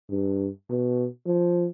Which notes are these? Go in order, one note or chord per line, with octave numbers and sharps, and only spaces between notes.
G2
B2
F3